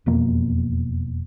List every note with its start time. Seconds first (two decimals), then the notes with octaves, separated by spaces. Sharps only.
0.06 E1 F2 B2 A#3